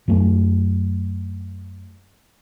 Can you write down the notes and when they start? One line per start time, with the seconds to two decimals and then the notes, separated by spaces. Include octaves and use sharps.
0.08 F#2 F#3 A3